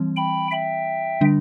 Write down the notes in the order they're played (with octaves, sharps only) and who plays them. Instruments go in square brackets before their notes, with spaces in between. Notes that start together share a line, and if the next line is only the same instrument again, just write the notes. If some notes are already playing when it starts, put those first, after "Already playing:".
Already playing: [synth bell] E3 G3 C4
[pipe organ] G5 B5
E5 G5
[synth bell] D3 G3 D4